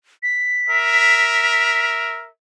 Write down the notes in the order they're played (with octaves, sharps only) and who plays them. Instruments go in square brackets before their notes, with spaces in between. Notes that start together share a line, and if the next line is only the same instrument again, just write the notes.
[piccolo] B6
[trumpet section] A#4 E5